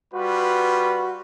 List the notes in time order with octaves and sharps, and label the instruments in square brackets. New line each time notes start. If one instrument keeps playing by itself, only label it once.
[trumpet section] G3 F4 B4 [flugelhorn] F#4